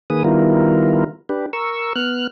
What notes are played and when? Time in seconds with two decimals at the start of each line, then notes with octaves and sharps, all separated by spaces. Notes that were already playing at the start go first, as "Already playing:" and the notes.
0.10 D#3 A#3 G#4 B4 D#6
0.24 D#3 G3 B3 E4 F4 A#4
1.29 D4 G4 B4
1.53 A#4 C#6 E6
1.96 B3 F6 F#6